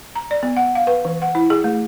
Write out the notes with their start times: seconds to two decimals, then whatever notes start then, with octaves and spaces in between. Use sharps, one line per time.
0.15 A#5
0.31 D5
0.43 B3
0.57 F#5
0.75 F5
0.87 B4
1.05 E3
1.22 F#5
1.35 E4
1.50 G#4
1.64 A3